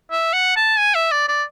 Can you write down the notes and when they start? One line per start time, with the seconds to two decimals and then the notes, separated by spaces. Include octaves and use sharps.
0.11 E5
0.33 F#5
0.56 A5
0.78 G#5
0.95 E5
1.11 D5
1.28 D5